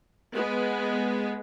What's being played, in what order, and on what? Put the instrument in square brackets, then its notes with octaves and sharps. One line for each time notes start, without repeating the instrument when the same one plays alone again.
[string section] G#3 B3